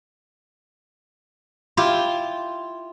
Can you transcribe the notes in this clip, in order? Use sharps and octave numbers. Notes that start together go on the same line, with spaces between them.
E4 F4 G4